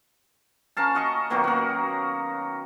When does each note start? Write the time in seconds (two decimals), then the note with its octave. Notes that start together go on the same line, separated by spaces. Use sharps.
0.77 C#4 A#4 F5 A5
0.95 F#4 D#5 C#6
1.30 B2 D#3 F#3 A#3
1.44 F#4 A#4